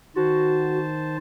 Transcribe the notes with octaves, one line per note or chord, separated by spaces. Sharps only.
D#3 F#4 C5 A5